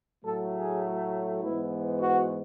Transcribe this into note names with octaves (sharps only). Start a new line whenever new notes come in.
A2 F#3 A3 A4
G#4
G#2 E3 B3 E4
F#4